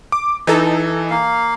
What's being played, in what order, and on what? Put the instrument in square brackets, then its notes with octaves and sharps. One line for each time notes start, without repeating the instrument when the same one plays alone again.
[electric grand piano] D6
[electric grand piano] E3 [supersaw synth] D#4 A4
[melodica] A#3 F5